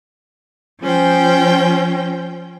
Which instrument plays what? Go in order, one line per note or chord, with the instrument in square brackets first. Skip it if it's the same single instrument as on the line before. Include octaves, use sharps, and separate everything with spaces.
[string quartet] F3 C#4 C5 G5